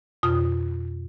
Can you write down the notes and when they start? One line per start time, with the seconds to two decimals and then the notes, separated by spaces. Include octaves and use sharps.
0.23 F2 B2 F4 D#6